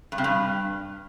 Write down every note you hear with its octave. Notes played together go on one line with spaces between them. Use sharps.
G2
C3
G2